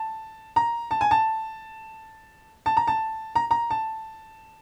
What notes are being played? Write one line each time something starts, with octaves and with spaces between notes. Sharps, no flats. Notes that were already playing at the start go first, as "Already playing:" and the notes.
Already playing: A5
A#5
A5
G#5
A5
A5
A#5
A5
A#5
A#5
A5